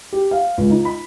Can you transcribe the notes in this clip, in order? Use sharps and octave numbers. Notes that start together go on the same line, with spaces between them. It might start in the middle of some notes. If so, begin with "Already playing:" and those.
G4
F5
C#2
D#4
B5